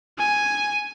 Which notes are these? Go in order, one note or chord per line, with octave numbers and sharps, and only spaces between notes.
G#5